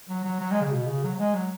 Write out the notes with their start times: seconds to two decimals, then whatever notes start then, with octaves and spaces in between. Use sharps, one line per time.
0.10 F#3
0.25 F#3
0.41 F#3
0.51 G#3
0.62 C#3
0.72 B2
0.87 C#3
1.03 F#3
1.14 F#3
1.19 G#3
1.35 F#3